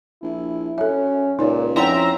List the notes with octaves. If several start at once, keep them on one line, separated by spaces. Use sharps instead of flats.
A#1 E4
F#2 C#4 A4 E5
C#2 A#2 D#4 C#5 D5
F2 C4 C#4 E4 D5 E5 F#5 A#5